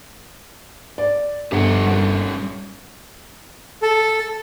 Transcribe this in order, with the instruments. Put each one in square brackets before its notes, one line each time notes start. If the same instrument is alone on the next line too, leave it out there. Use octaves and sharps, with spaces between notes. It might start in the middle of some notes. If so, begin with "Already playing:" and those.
[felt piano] D5
[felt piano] G1 [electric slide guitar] G4 C5 F#5
[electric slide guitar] G3 C#4
[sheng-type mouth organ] A4